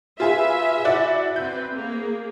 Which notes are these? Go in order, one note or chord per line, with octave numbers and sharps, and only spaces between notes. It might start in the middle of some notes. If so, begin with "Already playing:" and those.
F4 G#4 B4 E5
E4 F#4 D5
C4 B4 G6
A#3 G#4